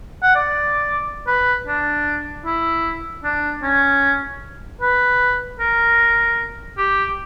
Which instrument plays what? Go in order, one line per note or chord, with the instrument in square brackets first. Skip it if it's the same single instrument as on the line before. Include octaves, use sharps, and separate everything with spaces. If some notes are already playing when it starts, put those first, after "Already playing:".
[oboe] F#5
D5
B4
D4
E4
D4
C#4
B4
A#4
G4